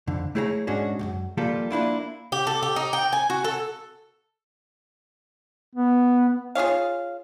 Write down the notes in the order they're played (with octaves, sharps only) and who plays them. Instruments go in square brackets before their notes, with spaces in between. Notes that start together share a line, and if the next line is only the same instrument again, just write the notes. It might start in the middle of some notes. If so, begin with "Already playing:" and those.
[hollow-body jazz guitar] F2 D3
A3 E4 G#4 C#5 A5 A#5
G#2 G#3 C#4 D4 F#4
B1 F#2
F3 G3 A#3 F4 A4
A#3 D4 E4 F4
[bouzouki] G4
A4
G4
D#4
G5
G#5
F#4
A4
[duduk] B3
[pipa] F4 G#4 C#5 F5